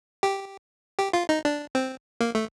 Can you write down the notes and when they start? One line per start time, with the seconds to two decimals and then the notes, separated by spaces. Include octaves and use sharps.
0.23 G4
0.99 G4
1.13 F4
1.29 D#4
1.45 D4
1.75 C4
2.21 A#3
2.35 A3